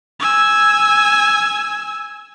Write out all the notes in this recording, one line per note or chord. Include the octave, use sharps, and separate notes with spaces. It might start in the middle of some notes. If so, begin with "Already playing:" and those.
G#5 E6